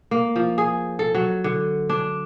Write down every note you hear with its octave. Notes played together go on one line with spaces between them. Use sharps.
A#3
F3
G#4
A4
F#3
D3
D4